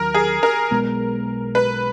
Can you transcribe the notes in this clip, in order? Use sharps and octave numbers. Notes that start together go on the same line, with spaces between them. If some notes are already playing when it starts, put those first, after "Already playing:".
Already playing: D#2 D#3 F#3 A#4
G#4
A#4
B1 B2 G#3 B3
B4